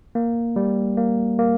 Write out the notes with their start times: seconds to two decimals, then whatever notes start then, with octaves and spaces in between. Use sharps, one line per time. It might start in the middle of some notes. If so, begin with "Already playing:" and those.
0.15 A#3
0.56 G3
0.97 A#3
1.39 A#3